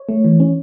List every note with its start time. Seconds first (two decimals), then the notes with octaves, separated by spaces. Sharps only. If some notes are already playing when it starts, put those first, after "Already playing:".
Already playing: C#5
0.09 A3
0.24 E3
0.40 C#4